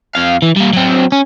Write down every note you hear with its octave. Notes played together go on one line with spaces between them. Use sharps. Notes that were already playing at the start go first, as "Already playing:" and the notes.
F2 F5
E3
G3 A#3
F#3 C4
C#4